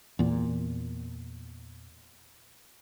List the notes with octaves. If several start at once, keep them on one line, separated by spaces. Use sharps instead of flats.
E2 A#2